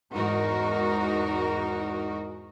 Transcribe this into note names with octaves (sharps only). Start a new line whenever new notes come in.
E2 G#2 D#4 F#4 A#4